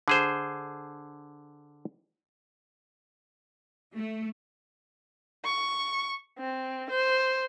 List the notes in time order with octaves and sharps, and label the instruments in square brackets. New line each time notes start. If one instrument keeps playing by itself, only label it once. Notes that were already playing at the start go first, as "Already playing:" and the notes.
[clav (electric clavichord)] D3 G#4 C5
[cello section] A3
[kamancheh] C#6
C4
C5